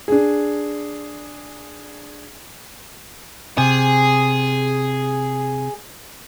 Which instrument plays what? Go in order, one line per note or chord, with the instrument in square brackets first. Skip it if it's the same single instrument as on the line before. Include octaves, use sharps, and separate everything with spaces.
[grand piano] D4 G#4
[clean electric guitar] C3 [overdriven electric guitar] G#4